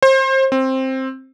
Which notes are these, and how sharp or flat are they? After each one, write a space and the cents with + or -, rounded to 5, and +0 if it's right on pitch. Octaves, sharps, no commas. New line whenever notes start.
C5 +30
C4 +10